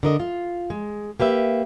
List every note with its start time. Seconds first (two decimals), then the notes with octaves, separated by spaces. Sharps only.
0.03 D3 A#4 D#5
0.20 F4
0.70 G#3
1.20 A#3 G4 B4 E5